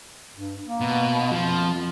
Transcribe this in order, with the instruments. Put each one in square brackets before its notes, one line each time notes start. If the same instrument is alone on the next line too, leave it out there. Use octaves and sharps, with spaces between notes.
[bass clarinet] G2
A#3
[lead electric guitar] B2
[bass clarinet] F2 [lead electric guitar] F3